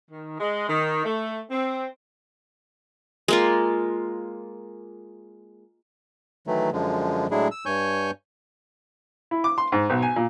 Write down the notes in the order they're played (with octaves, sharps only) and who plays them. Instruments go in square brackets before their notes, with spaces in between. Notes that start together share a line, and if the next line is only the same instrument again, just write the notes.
[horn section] D#3
G#3
D#3
A3
C4
[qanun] G#3 A#3 F4
[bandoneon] D#3 E3 F#3 A3
F#2 D3 F3 G#3
A2 F#3 G#3 D4 E4 G#4
E6
G2 C#5 G#5 C#6 G6
[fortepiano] E4
D6
C6
G#2
B1
G#5
A#2